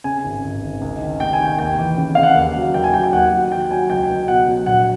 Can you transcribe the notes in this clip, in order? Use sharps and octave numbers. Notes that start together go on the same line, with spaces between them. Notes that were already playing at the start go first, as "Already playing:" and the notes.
C#3 G#5
G#1
G#1
G#1
C#2
D#3
C3 G5
G#5
D#3
G5
D#2 G5
E3
C#3
C#3 F5
F#5
D#2
F#3
D#2 G5
G#5
F#3 G5
G5
D#2 F#5
F#3 F#5
F#3 G5
F#3 G#5
C#2 G5
C#2
B2 F#5
F#3
A#1 F#5